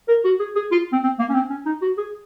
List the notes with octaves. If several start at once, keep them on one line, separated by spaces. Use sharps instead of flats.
A#4
F#4
G#4
G#4
F4
C4
C4
A#3
C#4
C4
C#4
D#4
F#4
G#4